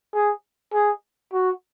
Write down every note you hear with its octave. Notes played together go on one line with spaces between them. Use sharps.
G#4
G#4
F#4